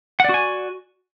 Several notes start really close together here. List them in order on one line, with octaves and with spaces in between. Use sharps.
F#5 D5 F#4 G#5